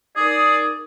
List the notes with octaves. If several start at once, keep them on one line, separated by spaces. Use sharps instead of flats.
D#4 G#4 A#4 D5 D#6